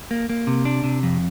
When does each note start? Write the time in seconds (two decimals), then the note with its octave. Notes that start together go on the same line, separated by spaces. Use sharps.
0.11 A#3
0.29 A#3
0.47 C3
0.65 D4
0.84 C3
1.03 F2